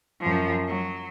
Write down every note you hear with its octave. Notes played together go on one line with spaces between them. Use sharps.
F#2 F3
F#3